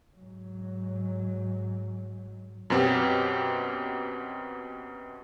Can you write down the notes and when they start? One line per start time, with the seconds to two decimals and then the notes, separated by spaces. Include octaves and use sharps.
0.17 G#2 F#3
2.70 F#2 B2 C4 C#4 G4